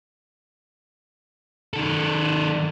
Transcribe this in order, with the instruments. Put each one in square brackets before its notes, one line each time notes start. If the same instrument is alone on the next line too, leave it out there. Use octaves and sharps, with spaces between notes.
[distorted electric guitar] D#3 A4